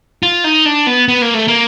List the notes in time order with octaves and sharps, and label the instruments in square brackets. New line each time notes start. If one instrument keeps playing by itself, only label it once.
[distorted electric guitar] F4
D#4
D4
B3
B3
A#3
A3
A#3